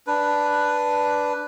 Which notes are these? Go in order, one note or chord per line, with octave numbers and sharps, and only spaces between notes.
D4 B4